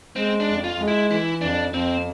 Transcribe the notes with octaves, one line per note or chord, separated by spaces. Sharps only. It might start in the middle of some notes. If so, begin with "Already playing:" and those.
G#3 C4
D4
F2
F4
G#3
E4
E3 E4
F2 D4
F2 C4